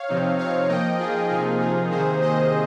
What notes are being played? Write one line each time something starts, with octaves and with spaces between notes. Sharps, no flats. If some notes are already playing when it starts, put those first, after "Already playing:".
Already playing: C#5 F5
C3 F3 C4 D#4
C#5 F5
F3 A#3 D#4 D#5 G5
F4 G#4
C3 F3 A#3 D#4 F4 G#4
F4 G#4
C3 D#3 A#3 D#4 G#4 C5
C5 D#5